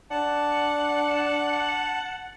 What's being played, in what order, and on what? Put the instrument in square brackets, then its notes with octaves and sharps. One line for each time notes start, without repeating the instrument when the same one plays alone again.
[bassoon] D4 [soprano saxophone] F#5 [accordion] A5